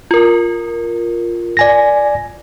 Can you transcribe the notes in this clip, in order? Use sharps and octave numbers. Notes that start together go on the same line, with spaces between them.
F4 A#4
D5 G#5 A#6